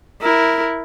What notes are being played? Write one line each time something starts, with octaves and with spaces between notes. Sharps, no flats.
E4 A#4